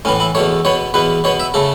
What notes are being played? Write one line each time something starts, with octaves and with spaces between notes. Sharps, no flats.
A2 E3 B3 C#4
E4
E2 B2 A3 C#5
B2 B3 C#5
E2 B2 B3 B4
B2 B3 C#5
E5
C#3 A3 A4